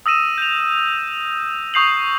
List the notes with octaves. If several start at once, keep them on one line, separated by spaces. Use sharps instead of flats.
D#6 E6 A#6 D#7 E7
G6 F7
C#6 D#6 G6 C7 F7 F#7